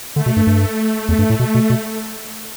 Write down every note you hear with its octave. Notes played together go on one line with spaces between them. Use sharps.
D3 A3
B2
G2
G2
E2 A3
G2
A2
B2
B2
B2